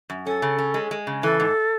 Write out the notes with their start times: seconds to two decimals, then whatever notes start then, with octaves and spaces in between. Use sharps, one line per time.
0.10 F#2
0.26 C#4 A4
0.42 C#3
0.59 C#4
0.74 G#3
0.91 G#3
1.07 C#3
1.23 E3 A4
1.40 G#2